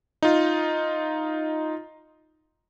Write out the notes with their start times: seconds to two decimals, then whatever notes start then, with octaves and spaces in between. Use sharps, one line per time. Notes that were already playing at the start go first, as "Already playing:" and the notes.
0.22 D#4 F4